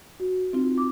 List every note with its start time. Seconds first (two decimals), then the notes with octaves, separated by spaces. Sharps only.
0.20 F#4
0.53 C4 D#4 F4
0.78 D6